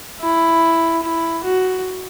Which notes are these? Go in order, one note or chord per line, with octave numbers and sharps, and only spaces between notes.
E4
E4
F#4